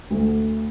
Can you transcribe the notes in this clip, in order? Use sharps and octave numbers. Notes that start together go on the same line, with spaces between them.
D2